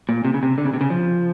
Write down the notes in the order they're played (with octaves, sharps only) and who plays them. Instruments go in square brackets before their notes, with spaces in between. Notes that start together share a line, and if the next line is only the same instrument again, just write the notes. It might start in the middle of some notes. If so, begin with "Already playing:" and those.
[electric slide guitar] A#2
C3
C#3
C3
D3
C#3
C3
C#3
F3